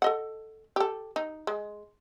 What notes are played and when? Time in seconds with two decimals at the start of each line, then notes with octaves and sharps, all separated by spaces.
0.02 A4 D#5 F#5
0.76 G4 A4
1.16 D#4
1.47 G#3